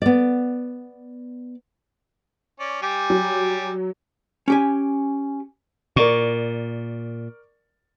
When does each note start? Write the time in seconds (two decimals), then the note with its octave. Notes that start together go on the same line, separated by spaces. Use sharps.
0.02 B3 D5
2.60 C#4 D5
2.82 G3 G4 G#5
3.10 F#3
4.48 C#4 G4 G#5
5.96 A#2 A#4 D5 C#6